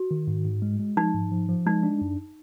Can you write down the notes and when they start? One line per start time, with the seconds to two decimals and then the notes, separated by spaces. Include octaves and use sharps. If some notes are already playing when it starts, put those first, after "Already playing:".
Already playing: F#4
0.11 D#3
0.27 G#2
0.45 G#2
0.62 G#3
0.80 G#3
0.97 F3 D#4
1.14 G#2
1.32 F3
1.49 F3
1.66 G#3 D#4
1.83 D4
2.01 F#2